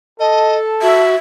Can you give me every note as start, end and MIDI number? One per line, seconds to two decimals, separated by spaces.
0.20 1.02 69
0.20 0.57 75
0.20 1.01 81
0.82 1.15 66
0.82 1.16 76